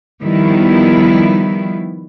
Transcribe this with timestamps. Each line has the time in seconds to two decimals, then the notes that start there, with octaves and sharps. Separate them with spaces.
0.21 D#3 F3 G3 B3 E4